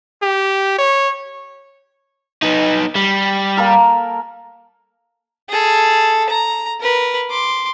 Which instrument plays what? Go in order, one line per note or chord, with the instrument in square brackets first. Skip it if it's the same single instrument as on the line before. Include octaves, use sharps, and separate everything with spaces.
[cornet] G4
C#5
[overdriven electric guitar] B3 D#4
G3
[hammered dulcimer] A#3 A4 A#4
[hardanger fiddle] G#4 A4
A#5
A#4 B4
C6 D6